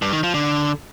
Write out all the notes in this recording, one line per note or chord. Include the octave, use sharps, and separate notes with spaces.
G2
D#3
F3
D3